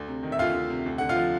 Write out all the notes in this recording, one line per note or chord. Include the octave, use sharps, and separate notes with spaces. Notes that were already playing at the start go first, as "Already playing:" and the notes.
Already playing: D2
C3
D#3
E5
D2 F4 F5
D2
C3
D2
D3 F#5
F4 F5
F3